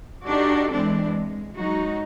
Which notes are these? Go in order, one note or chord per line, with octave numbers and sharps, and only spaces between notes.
D4 D#4 F#4 G4 A4 D5
E3 G#3 C4 D4
G#3
F#3 G#3 D#4 F#4